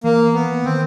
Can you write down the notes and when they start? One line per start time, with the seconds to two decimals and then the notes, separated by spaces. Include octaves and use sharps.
0.04 E3 A#3
0.34 B3
0.64 D#3 C4